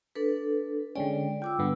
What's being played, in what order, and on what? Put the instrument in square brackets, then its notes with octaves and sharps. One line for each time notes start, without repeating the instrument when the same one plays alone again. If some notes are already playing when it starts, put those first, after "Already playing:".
[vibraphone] D4 A4 B4
[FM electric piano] D3 G#3 C#4 [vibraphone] D5 G5
[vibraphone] F4 D6 E6 [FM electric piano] G5
[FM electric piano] G2 D3 B3